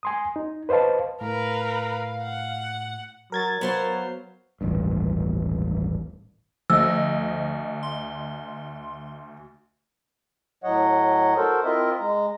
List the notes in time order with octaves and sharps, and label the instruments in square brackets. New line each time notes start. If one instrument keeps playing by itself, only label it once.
[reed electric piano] G#5 C6 D#6
D#4
B4 C5 D#5 F5 A5
[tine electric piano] A2 [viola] A#4 B4 [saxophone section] F5
[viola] F#5
[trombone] F#3 [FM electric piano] A#4 G#6 A6
[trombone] F#3 [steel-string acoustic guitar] B3 C5 F5
[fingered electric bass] D#1 A1 G2
[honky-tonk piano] D2 D#5 [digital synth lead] F3 [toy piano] E6
[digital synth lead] C6
[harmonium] A2 F#3 C#5 D#5 F#5
F#4 A4 A#4 C5
C4 E4 F4 A#4 D#5 E5
G#3 A#5